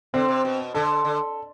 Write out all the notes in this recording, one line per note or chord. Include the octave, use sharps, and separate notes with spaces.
D3 C4
C3
B2
D3 A4
D3